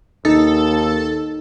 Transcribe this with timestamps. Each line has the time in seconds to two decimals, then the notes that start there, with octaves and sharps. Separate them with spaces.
0.25 D#2 D#4 A4